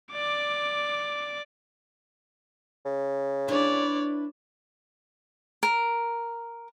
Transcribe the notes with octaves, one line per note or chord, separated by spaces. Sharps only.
D5 D6
C#3
D4 E4 B4 C#5 D5
A#4